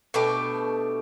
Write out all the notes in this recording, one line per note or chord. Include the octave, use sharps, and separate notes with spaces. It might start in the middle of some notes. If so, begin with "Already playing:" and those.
B2 A3 D4 G4